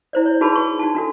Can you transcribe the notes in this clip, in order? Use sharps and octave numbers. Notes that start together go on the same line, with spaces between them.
E4 C5 D5
C#5
D#4 F#4 G#4 B4 A5 B5
C#6
D#4 F#4 A5
D4 F#4 A4